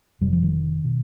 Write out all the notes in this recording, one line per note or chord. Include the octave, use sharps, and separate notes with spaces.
F1 F2 C3 G3
F3
D#3
B2